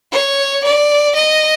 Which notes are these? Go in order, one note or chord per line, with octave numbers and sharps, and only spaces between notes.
C#5
D5
D#5